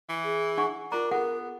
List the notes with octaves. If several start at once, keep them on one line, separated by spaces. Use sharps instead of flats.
E3
G#4
D4 F#5 C#6
D4 F4 A#4 A#5
B3 G#4 A4 F#5